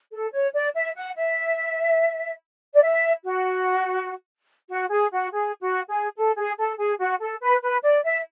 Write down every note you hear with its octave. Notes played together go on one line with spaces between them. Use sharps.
A4
C#5
D5
E5
F#5
E5
D5
E5
F#4
F#4
G#4
F#4
G#4
F#4
G#4
A4
G#4
A4
G#4
F#4
A4
B4
B4
D5
E5